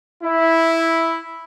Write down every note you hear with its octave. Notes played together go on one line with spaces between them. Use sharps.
E4